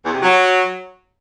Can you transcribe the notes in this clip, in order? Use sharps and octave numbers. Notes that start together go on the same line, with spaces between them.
E2
C3
F#3